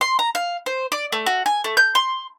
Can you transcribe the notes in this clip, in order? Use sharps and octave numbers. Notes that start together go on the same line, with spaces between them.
C6
A#5
F5
C5
D5
A3
F#4
G#5
A3
G6
C6